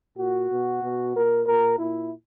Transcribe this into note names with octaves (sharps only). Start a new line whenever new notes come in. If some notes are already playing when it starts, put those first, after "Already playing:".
A#2 F#4
B2
B2
A#2 A#4
A#2 A#4
A#2 E4